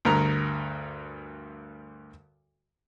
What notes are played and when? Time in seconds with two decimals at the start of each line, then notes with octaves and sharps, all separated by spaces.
0.05 D2 G2 A#4 A#5